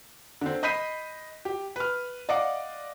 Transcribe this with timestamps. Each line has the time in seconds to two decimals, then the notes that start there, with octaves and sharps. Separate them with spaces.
0.41 D3 C4
0.63 D#5 B5 G6 B6 C7 D#7
1.45 G4
1.76 B4 F6
2.29 D5 D#5 F5 F#5 D6